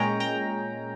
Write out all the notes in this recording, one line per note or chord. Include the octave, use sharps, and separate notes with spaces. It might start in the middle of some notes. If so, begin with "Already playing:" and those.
Already playing: A#2 G#3 C#4 G5 A#5
G5 A#5